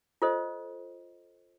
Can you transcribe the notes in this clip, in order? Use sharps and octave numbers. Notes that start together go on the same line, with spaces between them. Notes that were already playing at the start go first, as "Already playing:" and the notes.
F4 A4 C5 D#5